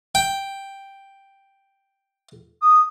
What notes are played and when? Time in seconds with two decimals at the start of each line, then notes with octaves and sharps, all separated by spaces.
0.15 G5
2.62 D#6